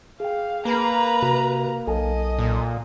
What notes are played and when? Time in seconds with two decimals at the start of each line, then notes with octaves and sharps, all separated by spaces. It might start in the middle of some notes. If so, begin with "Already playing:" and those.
0.20 G#4 F5 G5
0.65 A#3 B4 A#5
1.22 C3 F#4
1.87 B1 A4 D#5 G#5 A5
2.39 A#2